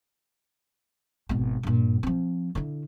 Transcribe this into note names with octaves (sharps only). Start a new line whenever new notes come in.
G#1 B2
G2 A#2
F3 C4
D3 E4